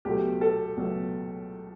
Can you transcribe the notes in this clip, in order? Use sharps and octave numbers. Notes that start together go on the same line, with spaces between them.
C#2 B2 F#3 A3 G4
A4
C#2 B2 F#3 A3